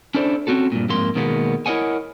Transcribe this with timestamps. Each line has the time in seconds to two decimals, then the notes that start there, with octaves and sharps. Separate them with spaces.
0.14 C#4 D4 E4 A4 C5 D5
0.47 C4 C#4 F#4 A4
0.72 G2 A#2
0.89 F2 G#2 A#3 C6
1.15 B2 D#3 G#3 A#3 B3
1.66 E4 A#4 C#5 D#5 F#5 G#5